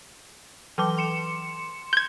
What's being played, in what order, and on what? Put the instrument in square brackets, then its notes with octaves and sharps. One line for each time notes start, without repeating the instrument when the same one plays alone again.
[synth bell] E3 F#3 D6
C6 C#7 E7
[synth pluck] G6 G#6